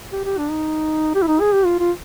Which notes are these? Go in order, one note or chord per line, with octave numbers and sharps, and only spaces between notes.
G4
G4
D4
D#4
G4
E4
D#4
G#4
G4
F4
F4